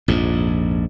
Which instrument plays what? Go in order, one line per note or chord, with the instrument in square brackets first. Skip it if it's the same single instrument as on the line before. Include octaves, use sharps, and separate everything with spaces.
[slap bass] A#1 F2 G#2